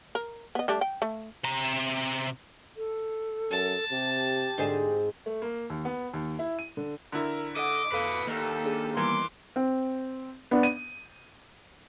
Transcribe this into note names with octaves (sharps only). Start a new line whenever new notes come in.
A#4
B3 D#5
G3 A3 D4
G5
A3
C3 A#5
A4
F#2 A5
C3 G4
G#2 D3 C4 G#4
A3
A#3
D#2
B3
D#2
E4
D#7
D3
D3 E4 A#4
A4 D#5 F#5 D6
F2 A4 B4 D#5 F5
D#2 A#3 G4 A4
D4 G#4
E3 G3 B3 A#4 C6 D6
C4
B3 D4
D#7